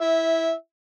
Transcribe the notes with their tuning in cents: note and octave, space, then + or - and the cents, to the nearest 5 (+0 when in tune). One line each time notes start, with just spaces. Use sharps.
E4 +0 E5 -15